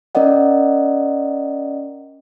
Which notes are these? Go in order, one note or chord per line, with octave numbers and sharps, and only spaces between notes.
C#4 A#4 D5 D#5 F#5